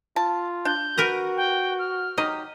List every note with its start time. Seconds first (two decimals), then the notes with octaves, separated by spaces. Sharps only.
0.16 F4 A5
0.65 D4 G6
0.98 F#4 A#4 B4 A#5
1.37 G5
1.79 F6
2.18 F#3 D#4 G4 D#5